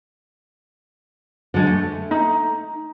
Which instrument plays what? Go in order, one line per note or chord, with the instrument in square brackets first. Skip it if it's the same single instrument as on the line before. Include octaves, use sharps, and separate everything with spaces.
[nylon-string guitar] D3 G#3
A3
[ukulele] D#4